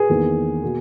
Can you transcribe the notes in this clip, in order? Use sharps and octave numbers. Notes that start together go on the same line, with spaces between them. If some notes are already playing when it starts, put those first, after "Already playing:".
Already playing: G#4 B4
E2 D#3 A#3
B2 A#3